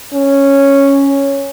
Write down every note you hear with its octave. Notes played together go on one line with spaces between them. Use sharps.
C#4